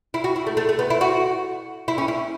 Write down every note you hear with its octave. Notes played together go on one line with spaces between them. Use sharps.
E4
F#4
E4
A3
A3
A3
B3
E4
F#4
E4
C#4
E4